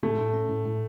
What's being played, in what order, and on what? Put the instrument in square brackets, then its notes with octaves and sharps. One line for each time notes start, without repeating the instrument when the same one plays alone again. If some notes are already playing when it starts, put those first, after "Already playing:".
[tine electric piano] A2 [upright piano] A3
[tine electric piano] A2
C#4
A2
A2